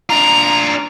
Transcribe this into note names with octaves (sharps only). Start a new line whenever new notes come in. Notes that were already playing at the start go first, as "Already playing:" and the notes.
D4 F4 A#5